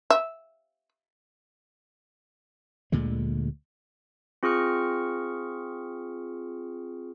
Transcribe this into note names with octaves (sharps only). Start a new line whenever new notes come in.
E5
D2 A#2 D3 G#3
C4 F4 G#4 C#6 F6 C#7